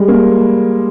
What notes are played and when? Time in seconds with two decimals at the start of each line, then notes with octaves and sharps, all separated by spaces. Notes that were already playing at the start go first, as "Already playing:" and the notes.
Already playing: G3 G#3
0.08 A#3